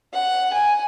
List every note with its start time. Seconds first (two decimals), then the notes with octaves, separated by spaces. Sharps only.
0.13 F#5
0.53 G#5